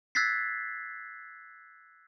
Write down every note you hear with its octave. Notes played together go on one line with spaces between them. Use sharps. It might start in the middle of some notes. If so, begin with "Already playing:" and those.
E6 F#6 G#6 A6 B6 C7